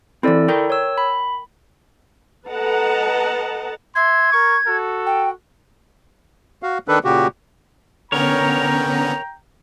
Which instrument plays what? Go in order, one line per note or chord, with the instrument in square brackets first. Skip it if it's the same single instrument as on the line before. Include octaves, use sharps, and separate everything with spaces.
[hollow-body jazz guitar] E3 C4 [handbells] E4 A4 D5
[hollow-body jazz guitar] A#4 G5
[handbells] C#5 E6
B5
[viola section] A4 B4 D#5 F#5 A5 A#5
[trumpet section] E5 C6 [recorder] G#6
[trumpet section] A#4 C#6
F#4 A4
[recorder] G5
[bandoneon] F#4 F5
D#3 D4 A4 B4
A#2 C#3 F#4 G4
[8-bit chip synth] D3 B3 C#4 [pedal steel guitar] A#4 C#5 [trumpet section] G5 A#5